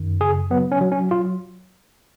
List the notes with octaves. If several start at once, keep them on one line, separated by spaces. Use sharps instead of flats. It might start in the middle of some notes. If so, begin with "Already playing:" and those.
Already playing: F#2 D#3
C#3 G#4
F#3 B3
C#4
F#3
C#4
F#3 F4